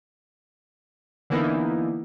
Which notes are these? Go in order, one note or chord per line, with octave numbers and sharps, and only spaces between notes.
D3 E3 A#3 B3 D#4 E4